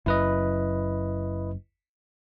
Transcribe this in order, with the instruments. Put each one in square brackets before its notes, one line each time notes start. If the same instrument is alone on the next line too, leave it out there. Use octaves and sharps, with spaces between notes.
[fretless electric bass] F#1 F#2 [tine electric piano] E4 B4 D#5